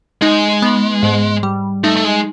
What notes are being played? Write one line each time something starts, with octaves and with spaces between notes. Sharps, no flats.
G#3 D#4
B3
G#2
G3
A3 D#4
A3
G#3